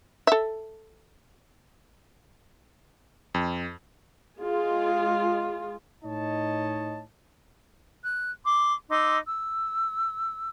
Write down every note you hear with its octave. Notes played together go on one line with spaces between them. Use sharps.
A4 E5
F2
G#3 F4 G#4
A2 D#4 C#5 D#5 A5
F#6
C6 D6
D#4 C6 D6 E6
E6